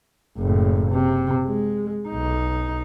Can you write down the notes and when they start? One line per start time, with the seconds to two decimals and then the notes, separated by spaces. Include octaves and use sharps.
0.38 F#1 A2
0.90 C3
1.45 G#3
2.09 B1 D#4